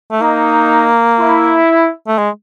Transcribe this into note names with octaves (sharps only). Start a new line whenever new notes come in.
A3
A#3 D#4
E4
A3
G#3